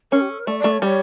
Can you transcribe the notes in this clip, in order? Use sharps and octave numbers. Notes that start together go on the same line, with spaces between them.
C#4 A#4
G4
A4
A#4
A3 D5
D5
A3
C#5
G3 C#5